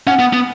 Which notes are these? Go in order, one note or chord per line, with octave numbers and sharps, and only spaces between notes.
C#4 F#5
B3
B3